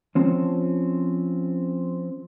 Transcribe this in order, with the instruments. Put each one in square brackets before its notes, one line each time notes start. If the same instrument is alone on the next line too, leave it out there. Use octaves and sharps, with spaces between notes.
[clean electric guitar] F3 C4 C#4